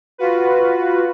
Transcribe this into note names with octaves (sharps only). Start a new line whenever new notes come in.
F4 F#4 B4